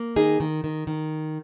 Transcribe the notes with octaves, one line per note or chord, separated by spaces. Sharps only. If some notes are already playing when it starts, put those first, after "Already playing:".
Already playing: A#3
D#3 D#4 G#4
D#3
D#3
D#3